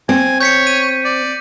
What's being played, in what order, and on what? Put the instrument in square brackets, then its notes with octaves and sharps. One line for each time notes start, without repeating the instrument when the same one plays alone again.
[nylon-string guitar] C4 [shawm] G#5
[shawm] C#5 [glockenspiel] G6 B6 C#7
[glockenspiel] D#7
[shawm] D5